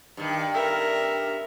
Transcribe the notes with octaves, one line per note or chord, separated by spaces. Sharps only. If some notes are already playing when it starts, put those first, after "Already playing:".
G2 D#3
A#4 E5